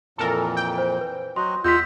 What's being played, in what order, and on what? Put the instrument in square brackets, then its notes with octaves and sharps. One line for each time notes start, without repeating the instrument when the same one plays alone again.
[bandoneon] F2 A#2 E3 [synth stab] A4 A#4
[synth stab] G5
[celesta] C5
B4
[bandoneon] F#3 F#4 D#5 [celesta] C6
[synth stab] E2 [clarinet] F4 [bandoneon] D#5 F#5 E6 [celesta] G6 B6